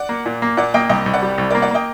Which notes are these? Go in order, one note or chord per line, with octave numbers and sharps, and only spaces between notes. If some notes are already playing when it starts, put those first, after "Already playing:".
Already playing: D5 F#5
A#3
A#2
A#3
A#2 D5 F#5
A#3 D#5 G5
C2 D#5 G5
C2
D5 F#5
G3
C2
A#3 A#4 D5
D5 F#5
A#3 D#5 G5